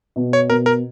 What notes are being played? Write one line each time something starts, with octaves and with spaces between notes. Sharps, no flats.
B2
C#5
B2 A#4
A#4